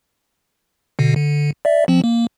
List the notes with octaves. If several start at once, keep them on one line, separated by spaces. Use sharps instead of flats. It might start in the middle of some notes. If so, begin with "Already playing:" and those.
B2 D3
D3
D5 E5
F3 C4
A#3